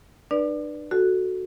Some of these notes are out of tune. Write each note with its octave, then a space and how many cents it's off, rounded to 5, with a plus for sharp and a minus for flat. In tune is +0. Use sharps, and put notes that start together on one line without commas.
D4 +40 B4 -20 D5 +0
F#4 +0 A4 +0